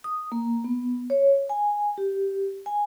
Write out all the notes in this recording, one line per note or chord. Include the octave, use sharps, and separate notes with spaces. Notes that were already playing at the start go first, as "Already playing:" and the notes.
D#6
A#3
B3
C#5
G#5
G4
G#5